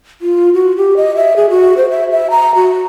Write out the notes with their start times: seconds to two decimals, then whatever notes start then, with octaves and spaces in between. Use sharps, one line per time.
0.22 F4
0.54 F#4
0.77 G4
0.97 D#5
1.16 E5
1.36 G#4
1.50 F#4
1.77 C5
1.91 E5
2.11 E5
2.30 A#5
2.55 F#4